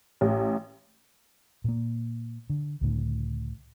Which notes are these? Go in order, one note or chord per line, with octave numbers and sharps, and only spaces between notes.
A1
A#2 A#3
D3
C#2 A2 D3